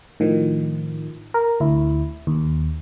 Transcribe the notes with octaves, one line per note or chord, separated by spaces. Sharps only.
A2 D#3 F3
A#4
D2 E4
D#2